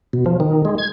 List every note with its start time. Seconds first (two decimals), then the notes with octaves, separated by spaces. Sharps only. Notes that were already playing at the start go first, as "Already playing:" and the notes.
0.13 B2
0.26 F3
0.40 D#3
0.65 G#3
0.78 G#6